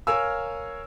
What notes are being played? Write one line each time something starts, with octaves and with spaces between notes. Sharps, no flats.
A#4 C#5 F5 G#5 E6